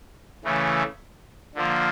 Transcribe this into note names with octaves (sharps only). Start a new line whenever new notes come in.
C#3 E3 A3
D3 F3 A#3